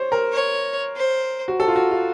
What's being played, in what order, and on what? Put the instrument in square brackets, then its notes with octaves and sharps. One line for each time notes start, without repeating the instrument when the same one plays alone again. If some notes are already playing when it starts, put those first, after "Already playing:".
Already playing: [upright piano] C5 C#5
A#4
[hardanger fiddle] C#5
C5
[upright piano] F#4
A4
F4
F#4
F4